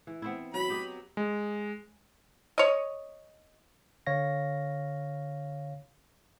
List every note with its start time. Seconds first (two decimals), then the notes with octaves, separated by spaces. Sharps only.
0.07 E3
0.22 B3 C4 E4
0.54 F#3 B5
0.70 G4 D#5
1.17 G#3
2.58 C#5 D#5
4.07 D3 C#5 F5 A#6